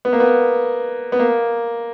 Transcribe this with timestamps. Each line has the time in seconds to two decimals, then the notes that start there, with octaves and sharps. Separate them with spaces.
0.05 B3
0.13 A#3
0.20 B3
1.12 B3
1.19 A#3